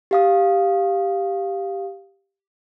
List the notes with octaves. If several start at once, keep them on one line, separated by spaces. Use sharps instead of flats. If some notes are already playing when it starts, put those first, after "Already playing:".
G4 F5 D#6